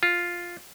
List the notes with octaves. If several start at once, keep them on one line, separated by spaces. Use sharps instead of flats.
F4